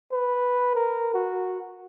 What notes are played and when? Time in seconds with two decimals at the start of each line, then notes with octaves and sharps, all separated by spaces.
0.12 B4
0.75 A#4
1.14 F#4